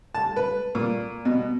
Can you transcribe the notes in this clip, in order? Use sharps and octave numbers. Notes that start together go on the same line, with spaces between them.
A5
B4
A#2
B2